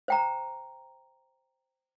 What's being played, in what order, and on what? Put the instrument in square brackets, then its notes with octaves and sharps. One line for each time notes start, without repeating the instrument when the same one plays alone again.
[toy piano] C5 G5 A#5